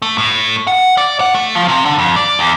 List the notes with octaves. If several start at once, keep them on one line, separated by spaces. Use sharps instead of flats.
A3
A2
F#5
D5
F#5
A3
F3
C3
D3
F2
D5
E2